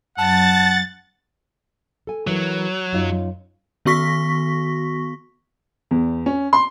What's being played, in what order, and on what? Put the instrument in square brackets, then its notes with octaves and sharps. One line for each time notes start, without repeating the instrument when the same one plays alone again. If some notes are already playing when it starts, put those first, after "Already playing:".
[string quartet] F#2 [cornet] F#5 [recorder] A5 [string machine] A6
[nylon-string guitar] A4 G#5
[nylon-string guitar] E3 E4 A#4 [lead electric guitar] F#3
[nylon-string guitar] F#2 D#4 F4
[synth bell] D#3 B3 F#4 C#6 A#6 B6
[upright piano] E2
C#4
C6